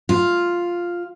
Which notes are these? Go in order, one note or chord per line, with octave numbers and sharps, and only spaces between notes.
F4